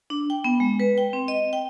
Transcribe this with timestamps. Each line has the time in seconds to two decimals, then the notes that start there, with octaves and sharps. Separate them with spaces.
0.10 D4
0.30 G5
0.44 B3
0.60 G#3
0.80 B4
0.98 G5
1.13 C4
1.28 D#5
1.53 G5